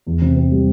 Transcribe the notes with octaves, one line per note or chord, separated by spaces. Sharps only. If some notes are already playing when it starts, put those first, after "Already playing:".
E2
C3
C4
G3